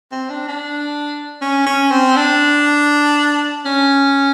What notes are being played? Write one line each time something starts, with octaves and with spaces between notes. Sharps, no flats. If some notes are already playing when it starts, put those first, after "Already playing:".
C4
D4
D4
C#4
C#4
C4
D4
C#4